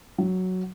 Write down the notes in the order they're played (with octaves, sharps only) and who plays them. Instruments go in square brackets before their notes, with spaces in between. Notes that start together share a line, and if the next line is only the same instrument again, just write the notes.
[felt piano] F#3